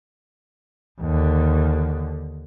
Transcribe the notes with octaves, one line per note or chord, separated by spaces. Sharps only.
D#2 D3